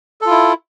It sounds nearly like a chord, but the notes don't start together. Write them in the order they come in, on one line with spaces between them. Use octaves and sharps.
A4 F4 E4